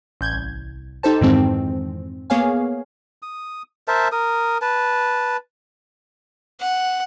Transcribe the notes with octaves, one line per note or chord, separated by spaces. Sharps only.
A1 G6 G#6
C2
D#4 G4 A4 C5 A5
F2 G#2 D#3 E3 G#3 C4
A#3 B3 G#4 C#5 F5 G#5
D#6
A#4 C5 E5 A5
A#4 D#6
B4 A5
F#5